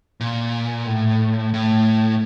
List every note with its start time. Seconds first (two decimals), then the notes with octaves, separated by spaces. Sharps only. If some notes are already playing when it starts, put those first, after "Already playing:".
0.20 A#2
0.86 A2
1.54 A2